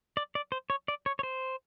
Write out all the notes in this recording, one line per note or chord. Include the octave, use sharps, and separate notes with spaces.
D5
D5
C5
C#5
D5
C#5
C#5
C5